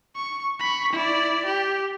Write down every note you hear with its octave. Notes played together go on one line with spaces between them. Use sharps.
C#6
B5 C#6
E4 D5
G4